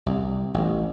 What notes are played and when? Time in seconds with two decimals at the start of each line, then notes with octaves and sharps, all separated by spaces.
0.06 C2
0.54 A1